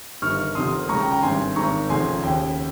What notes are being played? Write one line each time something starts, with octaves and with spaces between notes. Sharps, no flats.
G1 G2 D#3 C#6 F6
F1 F2 C3 D#3 C6 D#6
C#2 C#3 A#5 C#6
G5 A#5
G5 A#5
G#1 G2 D#3 G#5 C6
G#1 G#2 D#3 A#5 C#6
F1 F2 C#3 G#5 C6
D#2 C#3 G5